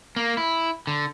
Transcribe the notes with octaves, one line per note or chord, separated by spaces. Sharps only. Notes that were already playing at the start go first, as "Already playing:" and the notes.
A#3
E4
D3